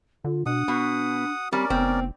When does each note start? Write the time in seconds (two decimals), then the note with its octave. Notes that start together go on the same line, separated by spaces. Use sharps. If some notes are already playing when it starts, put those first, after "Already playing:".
0.24 D3 F4
0.46 B2 D4 F#5 D#6
0.68 B2 B3
1.53 G3 C4 C#4 A#4 D5
1.70 F1 B3 C4